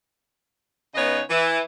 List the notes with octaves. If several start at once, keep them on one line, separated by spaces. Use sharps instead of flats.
C#3 B3 D#4 B4 C#5 D#5
E3